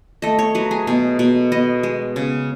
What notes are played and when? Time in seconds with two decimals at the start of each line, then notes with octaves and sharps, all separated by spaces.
0.22 A3 D#5
0.39 C#5
0.55 F#3 B4
0.71 G#4
0.87 B2 G#4
1.19 B2
1.52 B3 D#5
1.83 G#3
2.16 C#3